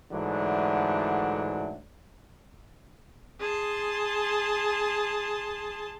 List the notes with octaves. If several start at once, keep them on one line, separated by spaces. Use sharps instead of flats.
G#2 D3 E3 F#3 A3 D4
G#4 A5 C6